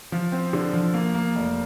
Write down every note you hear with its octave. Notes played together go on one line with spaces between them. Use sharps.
F3
C4
D3
F3
A#3
A#3
F1